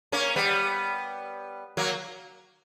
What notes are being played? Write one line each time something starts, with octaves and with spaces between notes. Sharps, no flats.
A#3 C#4
G3 B3
F#3 A#3